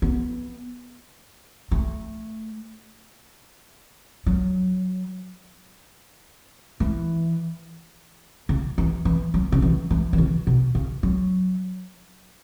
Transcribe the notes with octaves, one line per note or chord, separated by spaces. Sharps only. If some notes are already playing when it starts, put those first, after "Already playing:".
B3
A3
F#3
E3
C#3
E3
E3
F#3
C#3
E3
E3
E3
C#3
B2
C#3
F#3